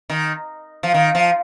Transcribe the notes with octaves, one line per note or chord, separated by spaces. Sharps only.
D#3
F3
D#3
F3